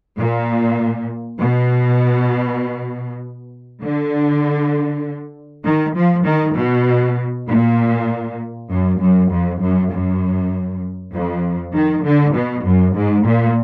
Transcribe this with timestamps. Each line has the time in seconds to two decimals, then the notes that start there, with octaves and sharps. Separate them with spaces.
0.17 A#2
1.40 B2
3.83 D3
5.65 D#3
5.95 F3
6.25 D#3
6.56 B2
7.48 A#2
8.70 F#2
9.00 F#2
9.31 F2
9.61 F#2
9.92 F#2
11.13 F2
11.74 D#3
12.04 D3
12.34 B2
12.65 F#2
12.95 G#2
13.25 A#2